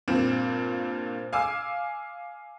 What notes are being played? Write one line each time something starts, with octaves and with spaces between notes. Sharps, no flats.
G2 A#2 C4
F5 G#5 D6 E6